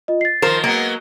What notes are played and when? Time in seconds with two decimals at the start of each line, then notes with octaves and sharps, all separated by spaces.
0.08 F4 D#5
0.21 A6 C7
0.42 D#3 F3 A#4 C5
0.64 F#3 G#3 A#3 B3